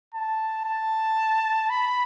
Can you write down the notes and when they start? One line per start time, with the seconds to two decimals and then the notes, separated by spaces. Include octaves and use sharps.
0.14 A5
0.65 A5
1.70 B5